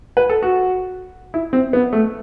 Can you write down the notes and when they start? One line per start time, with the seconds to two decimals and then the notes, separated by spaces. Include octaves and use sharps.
0.17 B4
0.29 A4
0.43 F#4
1.34 E4
1.53 C4
1.73 B3
1.93 A3